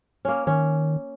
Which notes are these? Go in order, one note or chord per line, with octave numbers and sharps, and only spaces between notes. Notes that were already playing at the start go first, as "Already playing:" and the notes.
A#3 C#4
D#3 C#4